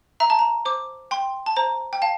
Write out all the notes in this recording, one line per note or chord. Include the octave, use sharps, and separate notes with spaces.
E5 A#5
A5
A#5
C5 D6
G5 C6
A5
C5 A#5
G5
F5 A5